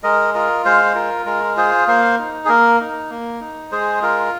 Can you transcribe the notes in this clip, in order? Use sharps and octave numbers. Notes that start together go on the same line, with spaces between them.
G#3 A#4 D#5
F4 A#4 D#5
G#3 C5 F5
F4 A#4
G#3 A#4
F4 G#4 C5
A#3 C5 F5
D#4
G#4
A#3 A#4
D#4
A#3
D#4
G#3 G#4 C5
F4 A#4